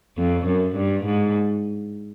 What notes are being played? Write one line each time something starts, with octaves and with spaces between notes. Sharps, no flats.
F2
F#2
G2
G#2